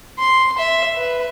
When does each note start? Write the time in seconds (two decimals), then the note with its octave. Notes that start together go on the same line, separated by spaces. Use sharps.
0.18 C6
0.58 E5
0.97 B4